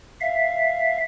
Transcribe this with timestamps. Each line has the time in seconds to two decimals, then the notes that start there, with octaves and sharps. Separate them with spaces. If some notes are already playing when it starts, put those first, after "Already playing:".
0.21 E5 F5